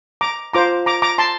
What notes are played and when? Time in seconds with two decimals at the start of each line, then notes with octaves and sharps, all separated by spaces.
0.21 A#5 D6
0.53 F4 C5 A#5 D6
0.86 A#5 D6
1.02 A#5 D6
1.18 A5 C6